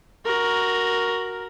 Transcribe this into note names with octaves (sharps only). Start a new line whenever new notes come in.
F#4 A#4